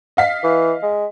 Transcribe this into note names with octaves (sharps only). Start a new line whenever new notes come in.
D#5 F5 B6
E3
G#3